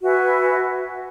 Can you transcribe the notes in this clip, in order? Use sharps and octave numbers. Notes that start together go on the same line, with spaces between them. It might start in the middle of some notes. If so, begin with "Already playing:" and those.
F#4 B4 E5 G#5